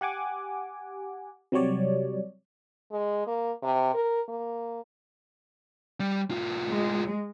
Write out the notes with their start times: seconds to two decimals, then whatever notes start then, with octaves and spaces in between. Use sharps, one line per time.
0.01 G4 F#5 G#5 D6
1.52 C3 F#3 G3 C#5 D5
2.91 G#3
3.27 A#3
3.63 C3
3.94 A#4
4.28 A#3
6.00 G3
6.31 A2 F4
6.67 G#3